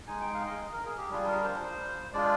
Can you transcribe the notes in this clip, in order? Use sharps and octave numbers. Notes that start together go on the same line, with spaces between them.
G#3 D#4 G#5
G5
F5
D#5
A#4
G#4
G4
G3 D4 F4 G#4
A#4
C5
G#3 D4 F4 D5